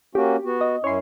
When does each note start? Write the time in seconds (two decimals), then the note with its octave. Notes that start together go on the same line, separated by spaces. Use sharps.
0.15 A#3 C#4 F#4 G4
0.45 B3 F#4
0.61 D#5
0.84 F#2 C#4 E4 C#5 C6